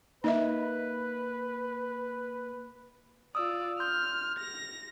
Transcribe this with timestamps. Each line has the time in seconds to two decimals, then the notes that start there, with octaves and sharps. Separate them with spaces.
0.24 A#3 D#4 B4 D#5 E5
3.35 F4 D5 D#6 E6
3.80 C6 F6 G6
4.39 A#6